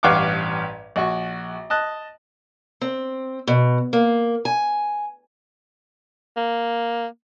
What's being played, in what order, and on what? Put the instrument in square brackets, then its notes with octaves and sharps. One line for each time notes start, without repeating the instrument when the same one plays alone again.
[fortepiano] A1 G2 F5 F#5 C#6 D6
A#1 F#4 C#6
D#5 A5 F#6
[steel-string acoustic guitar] C4
B2
A#3
G#5
[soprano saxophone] A#3